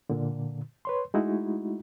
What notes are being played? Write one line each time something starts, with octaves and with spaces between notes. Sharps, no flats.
A#2 D3
B4 C#5 C6
G#3 A3 D#4 E4 F#4